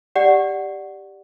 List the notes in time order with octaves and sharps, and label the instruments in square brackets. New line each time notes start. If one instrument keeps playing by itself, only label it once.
[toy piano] G4 D5 F#5